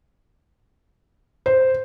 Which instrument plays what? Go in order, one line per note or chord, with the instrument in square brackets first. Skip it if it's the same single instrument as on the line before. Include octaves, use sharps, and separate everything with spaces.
[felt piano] C5